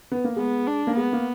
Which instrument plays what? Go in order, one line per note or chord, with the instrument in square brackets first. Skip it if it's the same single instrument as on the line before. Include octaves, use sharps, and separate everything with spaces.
[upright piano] B3
A#3
[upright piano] G#3 [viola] B3
[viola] D4
[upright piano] A#3
[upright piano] G#3 [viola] B3
[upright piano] A#3